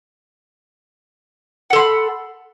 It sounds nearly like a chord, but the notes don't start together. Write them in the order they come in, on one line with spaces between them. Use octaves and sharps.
F#5 A4 C6 B5